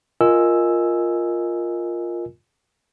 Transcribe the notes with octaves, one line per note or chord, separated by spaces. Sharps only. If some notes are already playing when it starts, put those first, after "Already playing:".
F4 A#4 D#5 G#5 E6